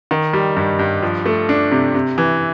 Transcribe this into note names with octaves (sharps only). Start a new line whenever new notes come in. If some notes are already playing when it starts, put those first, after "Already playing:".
D#3
G3
G2
G2
F3
A3
D4
C3
C3
E3